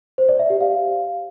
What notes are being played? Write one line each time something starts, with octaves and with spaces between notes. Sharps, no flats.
C5
D5
E5
G4
F5